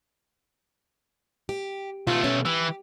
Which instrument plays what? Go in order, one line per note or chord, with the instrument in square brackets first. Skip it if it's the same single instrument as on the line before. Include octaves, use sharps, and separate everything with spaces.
[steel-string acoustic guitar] G4
[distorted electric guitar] B1 A3 [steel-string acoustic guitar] F4
[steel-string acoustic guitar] C#4
[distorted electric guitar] E3 [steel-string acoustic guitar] G4